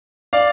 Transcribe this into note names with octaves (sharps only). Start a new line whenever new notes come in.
D5 F5